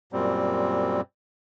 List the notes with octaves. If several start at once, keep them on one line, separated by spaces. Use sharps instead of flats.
F#2 A#2 G3 C4